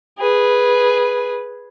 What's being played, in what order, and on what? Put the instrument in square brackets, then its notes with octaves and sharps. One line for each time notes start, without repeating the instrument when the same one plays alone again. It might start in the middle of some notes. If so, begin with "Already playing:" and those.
[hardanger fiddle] G#4 B4